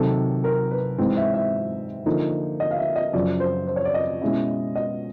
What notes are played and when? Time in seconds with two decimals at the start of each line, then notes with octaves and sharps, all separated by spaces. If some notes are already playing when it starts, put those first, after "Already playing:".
Already playing: C3 D#3 F#3 A4
0.44 A#4
0.71 B4
0.98 G#2 E3 G#3 C4
1.17 E5
1.34 E5
2.06 D3 F3 A#3 D#4
2.60 D#5
2.71 F5
2.78 E5
2.96 D#5
3.13 F#2 C#3 F3 D5
3.40 C5
3.67 C5
3.76 C#5
3.85 D5
3.94 D#5
4.22 B2 G#3 C#4 E4
4.75 D#5